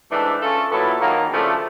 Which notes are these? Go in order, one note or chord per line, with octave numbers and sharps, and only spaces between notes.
G#2 E3 A3 D4
A3 C#4 F4 A4
A#2 F#3 B3 E4 A4
D#3 F#3 A#3
C#3 F3 A3 D4